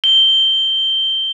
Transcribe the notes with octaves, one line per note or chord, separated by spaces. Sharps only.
G7